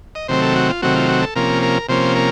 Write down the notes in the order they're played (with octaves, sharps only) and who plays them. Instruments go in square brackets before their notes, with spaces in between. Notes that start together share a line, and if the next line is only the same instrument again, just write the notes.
[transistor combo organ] D#5
C3 D#3 F#3 A3 C4 C5
A4
F#4
F4
C3 D#3 F#3 A3 C4 F#4
F4
F#4
A4
C3 F3 A#3 C#4 A#4
A#4
C3 F3 A#3 C#4 C5
A#4